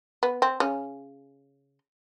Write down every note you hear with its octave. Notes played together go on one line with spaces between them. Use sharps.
B3
C4
C#3 C#4